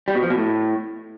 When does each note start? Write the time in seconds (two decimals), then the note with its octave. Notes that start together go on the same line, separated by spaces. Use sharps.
0.08 G3
0.15 B2
0.23 F3
0.30 B2
0.38 A2